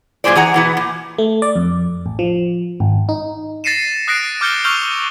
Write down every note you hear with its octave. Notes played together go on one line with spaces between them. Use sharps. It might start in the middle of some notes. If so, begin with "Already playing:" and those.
F#2 A#2 C#3 G#4 C5 D5
E3 G#4 F#5 A#5
B2 E3 B3
A#2
A3
D5
F2
A1
F3
G#1
D#4
A6 A#6 C7 C#7 D#7 E7
D#6 F#6 A#6 C7 D7
D6 F6 G6 A6 C#7 G7
C#6 E6 F6 G6 F7 G7